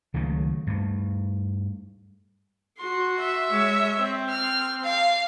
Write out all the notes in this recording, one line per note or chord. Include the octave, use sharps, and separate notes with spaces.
C#2 D#3 F#3 A3
G2 A3
F#4 C6
E5
G#3 C#5
C4
F6
F5